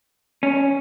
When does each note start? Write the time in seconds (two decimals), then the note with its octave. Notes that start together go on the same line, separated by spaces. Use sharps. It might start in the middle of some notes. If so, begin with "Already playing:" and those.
0.43 C#4